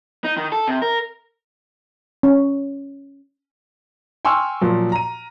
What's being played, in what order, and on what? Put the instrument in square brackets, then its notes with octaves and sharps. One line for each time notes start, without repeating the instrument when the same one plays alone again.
[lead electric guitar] D#4
D#3
A4
C3
A#4
[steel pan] C#4
[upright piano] G5 G#5 C6 C#6 E6 F6
A#2 F3 F#3
A#5 D#7